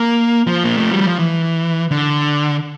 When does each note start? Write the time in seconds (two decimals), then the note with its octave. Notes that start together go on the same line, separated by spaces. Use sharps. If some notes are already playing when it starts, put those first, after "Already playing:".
Already playing: A#3
0.47 F3
0.64 A#3
0.78 A3
0.92 G3
1.06 F3
1.19 E3
1.91 D3